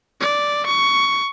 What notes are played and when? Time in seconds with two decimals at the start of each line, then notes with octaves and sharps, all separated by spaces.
0.20 D5
0.66 C#6